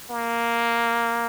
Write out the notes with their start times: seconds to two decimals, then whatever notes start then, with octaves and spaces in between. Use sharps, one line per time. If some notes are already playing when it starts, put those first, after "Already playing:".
0.10 A#3